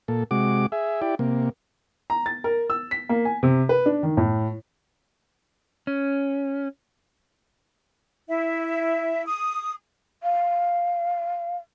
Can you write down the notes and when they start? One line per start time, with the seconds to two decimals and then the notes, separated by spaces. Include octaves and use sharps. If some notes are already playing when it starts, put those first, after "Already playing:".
0.08 A#2 A4
0.31 C3 G#3 F#4 D6
0.72 G#4 E5
1.02 E4 G4 D5
1.19 C3 A#3
2.10 A#5
2.26 A6
2.44 A#4
2.70 E6
2.91 B6
3.09 A#3
3.25 G#5
3.43 C3
3.69 B4
3.86 D4
4.03 D#3
4.17 A2
5.87 C#4
8.29 E4 E5
9.26 D#6
10.23 F5